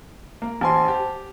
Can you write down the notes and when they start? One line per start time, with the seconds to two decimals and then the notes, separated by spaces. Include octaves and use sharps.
0.42 A#3
0.61 A1 C5 G#5 A5 C6
0.88 G4